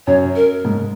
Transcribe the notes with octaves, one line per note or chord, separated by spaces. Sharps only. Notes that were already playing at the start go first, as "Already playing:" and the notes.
F#2 C#5
A#4
G#2